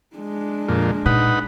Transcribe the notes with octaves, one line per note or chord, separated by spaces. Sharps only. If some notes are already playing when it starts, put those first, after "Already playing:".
G#3 D4
F2 A#2
A#2 D#4 B4 F#5